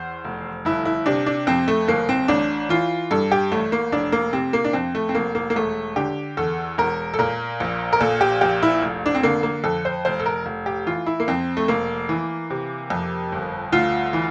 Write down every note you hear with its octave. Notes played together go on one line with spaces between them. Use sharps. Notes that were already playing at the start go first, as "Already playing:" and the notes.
Already playing: E2 C5
F1
G1 E4
E4
C3 D4
D4
F2 C4
A3
G1 A#3
C4
A1 D4
E3 F4
G2 A4
G4
A1 A3
A#3
F1 D4
A#3
C3 C4
A#3
D4
F2 C4
A3
C4
F1 A#3
A#3
A#3
E1 A3
D3 G4
E2 A4
E1 A#4
A4
A#2 A#4
A#1
A#4
A#2 A4
G4
A#1 G4
E4
F1
D4
C4
D3 A#3
A#3
F2 A4
C5
F1 C5
A4
A#4
F1
G4
E3 F4
E4
A#3
F2 C4
A3
F1 A#3
E3
C3
F2
G1
D2 F4
E3